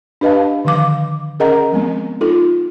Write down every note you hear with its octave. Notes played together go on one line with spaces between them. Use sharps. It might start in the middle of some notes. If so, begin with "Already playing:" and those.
D4 G4 B4 D#5 F5 A5
D3 D#3 F3 F5 D6
C#4 G#4 A#4 D#5 F#5 A#5
F3 G#3 B3 C4
D#4 F4 A4